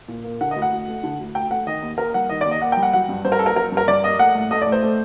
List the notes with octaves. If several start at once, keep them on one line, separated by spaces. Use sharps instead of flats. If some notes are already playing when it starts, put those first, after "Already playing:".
A#2
A#3
D3 F#5
D#5
D2
F#5
D2
A3
D3
D2
D2 G5
A3 F#5
D#3 D#5
D#2
A#3 A#4
G3 F#5
D#3 D#5
D5
D#2
D#5
A#3 F#5
G5
G3
F#5
F#3 F#5
G2
G2 C5
A#4
A#3 A4
A#4
F#3 A#4
G2
A#4
G2 D5
A#3 D#5
A3 F#5
A2
A3 D#5
D5
A2
C5
A3